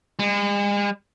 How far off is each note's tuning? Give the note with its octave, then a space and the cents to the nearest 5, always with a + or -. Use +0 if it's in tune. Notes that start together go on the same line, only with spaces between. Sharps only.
G#3 -40